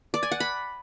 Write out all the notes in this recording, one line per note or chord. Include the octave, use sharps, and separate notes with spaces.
D5
G#5
F#5
B5